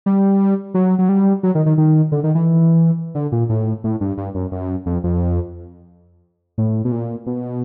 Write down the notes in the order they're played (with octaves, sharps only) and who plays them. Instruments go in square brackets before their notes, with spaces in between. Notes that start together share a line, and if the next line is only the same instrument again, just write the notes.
[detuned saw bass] G3
F#3
F#3
G3
F#3
D#3
D#3
D#3
D3
D#3
E3
D3
A#2
A2
A2
G2
G2
F#2
F#2
F2
F2
A2
B2
A#2
B2